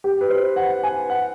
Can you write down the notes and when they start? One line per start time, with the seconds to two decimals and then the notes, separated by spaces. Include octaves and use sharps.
0.04 G4
0.21 B4
0.30 C5
0.56 F#5
0.83 G#5
1.10 F#5